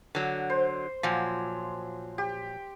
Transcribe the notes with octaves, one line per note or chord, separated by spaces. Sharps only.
D3 F#3
C5
A#2 F3 F#3
G4